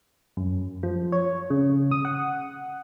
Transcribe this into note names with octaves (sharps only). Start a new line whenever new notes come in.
F#2
F3
C#5
C#3
D#6
F#5